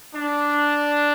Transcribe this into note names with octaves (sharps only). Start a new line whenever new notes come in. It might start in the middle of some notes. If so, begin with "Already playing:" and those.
D4